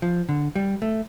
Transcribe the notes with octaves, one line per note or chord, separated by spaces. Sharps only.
F3
D3
G3
A3